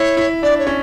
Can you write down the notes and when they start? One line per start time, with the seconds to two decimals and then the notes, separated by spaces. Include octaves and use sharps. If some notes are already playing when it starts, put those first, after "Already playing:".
Already playing: E4 C#5
0.17 E4
0.42 D4 D5
0.59 C#5
0.67 C#4